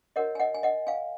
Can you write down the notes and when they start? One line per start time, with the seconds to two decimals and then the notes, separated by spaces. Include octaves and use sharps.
0.16 F#4 A#4 C#5 D#5 F#5
0.35 G#5
0.40 D#5 F#5
0.55 G#5
0.63 D#5 F#5
0.87 F5 G#5